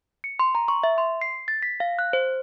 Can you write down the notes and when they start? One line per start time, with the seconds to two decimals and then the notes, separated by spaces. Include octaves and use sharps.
0.24 C#7
0.39 C6
0.55 A#5
0.68 C#6
0.83 E5
0.98 C6
1.21 C7
1.48 A6
1.63 B6
1.80 F5
1.99 F#6
2.13 C5